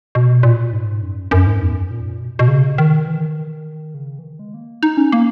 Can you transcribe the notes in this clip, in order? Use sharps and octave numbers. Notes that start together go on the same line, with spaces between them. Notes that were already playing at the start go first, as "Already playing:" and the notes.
B2
A#2
G#2
F#2
F#2
G#2
E2
F#2
A#2
B2
B2
C#3
D#3
E3
D#3
C#3
E3
D#3
G#3
A#3
D#4
C#4
A#3